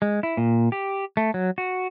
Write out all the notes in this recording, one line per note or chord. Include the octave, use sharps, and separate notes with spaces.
G#3
E4
A#2
G4
A3
F#3
F#4